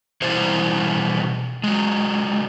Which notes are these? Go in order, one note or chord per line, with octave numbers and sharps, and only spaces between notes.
B2 E3 G3 E4 C5
F#3 G#3